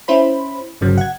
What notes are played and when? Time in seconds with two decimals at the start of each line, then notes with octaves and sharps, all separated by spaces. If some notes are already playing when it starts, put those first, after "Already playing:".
0.08 C#4 E4 C5 B5
0.81 G1 C#3 F#3
0.98 F#5 G#6